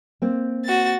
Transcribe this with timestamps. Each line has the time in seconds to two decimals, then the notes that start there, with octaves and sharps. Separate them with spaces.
0.22 A#3 C4
0.65 F#4 A6